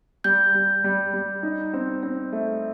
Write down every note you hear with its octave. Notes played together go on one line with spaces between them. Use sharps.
G3 G6
G3
G3
G3
D#4
C4
C4
A3